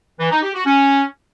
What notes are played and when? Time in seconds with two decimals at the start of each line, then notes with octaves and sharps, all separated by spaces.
0.20 E3
0.31 D#4
0.43 G4
0.54 F#4
0.66 C#4